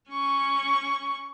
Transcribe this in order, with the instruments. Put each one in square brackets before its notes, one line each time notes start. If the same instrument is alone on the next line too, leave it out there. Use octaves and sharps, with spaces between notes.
[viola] C#4 C#6